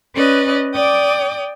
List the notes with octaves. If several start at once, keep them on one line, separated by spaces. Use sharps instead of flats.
C#4 B4 D5 D#5
D5 G5 D6 D#6